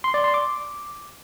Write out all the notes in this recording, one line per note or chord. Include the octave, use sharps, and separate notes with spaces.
C6
D5
C6
D6